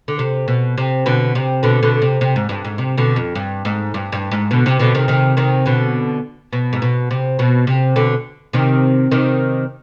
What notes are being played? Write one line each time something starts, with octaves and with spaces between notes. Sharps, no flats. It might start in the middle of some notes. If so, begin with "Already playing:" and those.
D3
C3
B2
C3
B2 D3
C3
B2 D3
B2 D3
C3
C3
G#2
G2
G#2
C3
B2 D3
F2
G2
G#2
G2
G2
G#2
B2 D3
C3
B2 D3
C3 D#3
C3 D#3
C3 D#3
B2 D3
B2
G#2
B2
C3
B2
C3
B2 D3
C3 D#3
C3 D#3